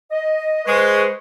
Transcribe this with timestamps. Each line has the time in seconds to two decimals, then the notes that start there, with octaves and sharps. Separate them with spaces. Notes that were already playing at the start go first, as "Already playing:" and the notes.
0.11 D#5
0.66 G#3 B4 C5 C#6